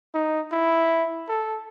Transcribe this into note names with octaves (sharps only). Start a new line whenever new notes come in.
D#4
E4
A4